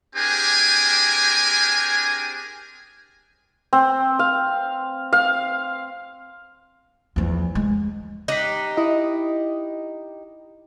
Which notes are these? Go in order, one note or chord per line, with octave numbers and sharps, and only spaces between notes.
C4 D4 G4 G#4 A#4 G#5
C4
F5
F5
E2 F3
G#3
D#4 G4 F#6 B6
E4 D#5